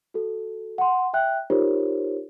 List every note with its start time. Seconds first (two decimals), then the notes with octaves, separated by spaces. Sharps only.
0.14 F#4 A4
0.78 F#5 C6
1.14 E5 G5 F#6
1.50 D#4 F4 G4 A#4 C5 C#5